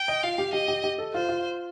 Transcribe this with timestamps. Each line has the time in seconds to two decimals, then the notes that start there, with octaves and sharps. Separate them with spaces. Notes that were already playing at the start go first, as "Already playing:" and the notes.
Already playing: G5
0.08 D#5
0.23 F4 F5
0.38 G4
0.53 G4 D#5
0.68 G4
0.84 G4
0.98 A4
1.13 F4 C5
1.29 F4